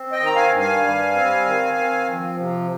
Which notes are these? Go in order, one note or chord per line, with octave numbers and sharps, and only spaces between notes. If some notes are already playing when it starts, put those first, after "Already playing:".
Already playing: C4
D#5 G5
D#3
A#5
F5 G#5
G2
F5 G#5
G3
C4
D#3
C4
F3
C3